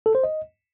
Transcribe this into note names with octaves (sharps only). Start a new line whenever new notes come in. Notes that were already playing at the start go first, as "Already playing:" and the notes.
A4
C5
D#5